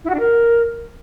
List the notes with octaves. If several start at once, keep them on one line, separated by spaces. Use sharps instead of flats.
E4
F#4
D4
A#4